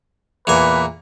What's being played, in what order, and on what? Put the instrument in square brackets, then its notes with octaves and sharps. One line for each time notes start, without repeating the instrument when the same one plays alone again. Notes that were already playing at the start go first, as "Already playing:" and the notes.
[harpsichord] E2 A#2 G#5 [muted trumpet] B4